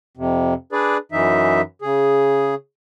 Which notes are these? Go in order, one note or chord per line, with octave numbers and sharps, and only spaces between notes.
F2 C3
D4 G#4 B4 D5
F#2 E3 D#4 E5
C#3 G#4